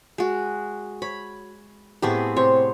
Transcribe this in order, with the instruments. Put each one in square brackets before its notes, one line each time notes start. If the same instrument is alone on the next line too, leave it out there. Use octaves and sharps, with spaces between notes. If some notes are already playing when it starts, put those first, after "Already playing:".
[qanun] G#3 F#4
[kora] C#5 [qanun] B5
[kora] A2 A3 G4 [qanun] B3 C4 G#4
[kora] C3 C5 [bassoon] C4 [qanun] C#5